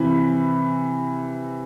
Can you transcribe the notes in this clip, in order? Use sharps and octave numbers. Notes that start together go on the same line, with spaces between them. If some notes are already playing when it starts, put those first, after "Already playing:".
Already playing: C3 E3 B5